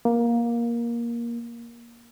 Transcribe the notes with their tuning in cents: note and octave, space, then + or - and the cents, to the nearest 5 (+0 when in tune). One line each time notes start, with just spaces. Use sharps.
A#3 +15